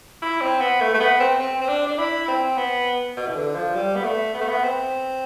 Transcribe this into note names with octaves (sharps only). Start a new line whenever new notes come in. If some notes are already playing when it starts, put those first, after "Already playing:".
E4
C4
B3
A3
A3
B3
C4
C4
C4
D4
D4
E4
C4
B3
B2
E3
D3
F3
G3
B3
A3
B3
A3
B3
C4